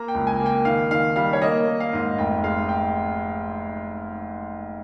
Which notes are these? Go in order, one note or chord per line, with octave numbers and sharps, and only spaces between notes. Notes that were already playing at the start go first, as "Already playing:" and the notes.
Already playing: A#3 A#5
G5
C#2
G#5
A#3
G5
D#3 F5
D#3 F5
G3 F5
C#5
A#3 D#5
A#3
F5
G#2
F1 G5
G#3 F5
G5